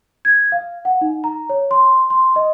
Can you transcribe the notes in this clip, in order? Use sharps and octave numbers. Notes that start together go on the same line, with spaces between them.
G#6
F5
F#5
D#4
A#5
C#5
C6
C6
D#5